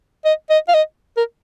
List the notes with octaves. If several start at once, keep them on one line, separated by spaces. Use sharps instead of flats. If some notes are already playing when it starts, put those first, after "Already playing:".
D#5
D#5
F5
D#5
A#4